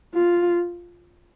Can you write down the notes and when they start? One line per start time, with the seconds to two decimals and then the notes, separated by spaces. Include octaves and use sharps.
0.14 F4